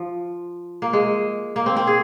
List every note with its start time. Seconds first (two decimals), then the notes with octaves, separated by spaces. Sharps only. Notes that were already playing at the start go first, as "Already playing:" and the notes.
Already playing: F3
0.82 A#3
0.93 G#3
1.56 A#3
1.66 C4
1.77 C4
1.87 G#4